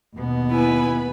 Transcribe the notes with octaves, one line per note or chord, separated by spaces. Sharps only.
D#2 B2 B3
E4 B4 G#5 B5